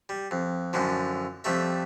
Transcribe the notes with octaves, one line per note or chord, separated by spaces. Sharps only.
G3
F2
F#2 A2 D3 F3
F2 G3 A3 E5